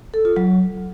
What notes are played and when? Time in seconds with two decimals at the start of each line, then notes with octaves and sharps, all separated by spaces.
0.14 A4
0.25 F4
0.36 F#3